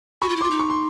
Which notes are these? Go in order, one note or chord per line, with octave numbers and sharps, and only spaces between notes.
F#4 B5 C#6
F4
E4
F4 C6 D6
D#4
C#6
C6